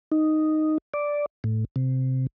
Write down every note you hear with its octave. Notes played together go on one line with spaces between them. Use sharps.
D#4
D5
A2
C3